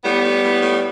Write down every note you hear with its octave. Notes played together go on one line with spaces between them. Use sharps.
A2 G3 B3
A2
A2
A2